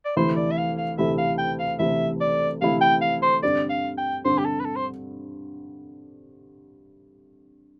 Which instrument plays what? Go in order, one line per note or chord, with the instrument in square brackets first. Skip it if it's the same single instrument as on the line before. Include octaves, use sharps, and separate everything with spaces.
[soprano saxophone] D5
[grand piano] D2 C3 E3 A3 E4 [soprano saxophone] C5
[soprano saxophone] D5
E5
F5
F5
[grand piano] D2 C3 E3 A3 E4 [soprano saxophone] E5
[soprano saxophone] F5
G5
F5
[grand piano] D2 C3 E3 A3 E4 [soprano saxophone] E5
[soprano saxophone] D5
[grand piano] D2 C3 E3 A3 E4 [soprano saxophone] F5
[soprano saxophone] G5
F5
C5
[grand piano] G2 D3 G3 C4 [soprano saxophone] D5
[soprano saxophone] F5
G5
[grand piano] G2 D3 G3 C4 [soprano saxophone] C5
[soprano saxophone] G4
A4
B4
A4
C5